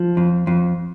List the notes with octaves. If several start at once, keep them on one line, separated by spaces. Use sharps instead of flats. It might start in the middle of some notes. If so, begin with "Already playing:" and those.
Already playing: F3
F2
F2